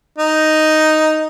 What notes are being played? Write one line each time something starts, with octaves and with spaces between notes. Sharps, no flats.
D#4